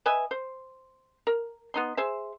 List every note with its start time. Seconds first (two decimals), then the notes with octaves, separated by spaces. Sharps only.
0.06 B4 D#5 E5 G#5
0.31 C5
1.27 A#4
1.74 B3 D#4 C6
1.97 G#4 C5 E5